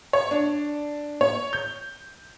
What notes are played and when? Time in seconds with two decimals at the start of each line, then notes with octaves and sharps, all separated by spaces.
0.13 C#5
0.31 D4
1.21 C#5
1.53 G6